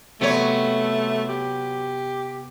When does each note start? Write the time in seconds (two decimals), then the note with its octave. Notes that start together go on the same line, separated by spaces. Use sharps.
0.21 C3 F#3 A3 B3 C#5
1.29 G4